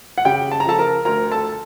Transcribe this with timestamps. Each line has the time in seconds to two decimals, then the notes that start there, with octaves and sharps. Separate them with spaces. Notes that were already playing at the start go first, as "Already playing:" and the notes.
0.18 F#5
0.25 C#3 G4 G5
0.51 A5
0.60 A#5
0.65 F3 A4 A5
0.79 A#4 A#5
1.05 D2 A#4 A#5
1.32 A4 A5